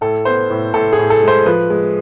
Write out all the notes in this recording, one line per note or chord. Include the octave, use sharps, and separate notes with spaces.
A2 A4
B3 C5
A2
A2 A4
G#4
A2
A4
G#3 C5
F3 B4
G#3